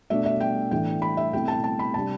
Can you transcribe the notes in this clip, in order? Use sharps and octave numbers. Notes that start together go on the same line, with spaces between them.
B2 A3 D4 E5
E5
G5
A2 E3 A3 D4 G5
B5
E5
B2 A3 C4 E4 G5
A5
A5
B5
C3 G3 D4 A5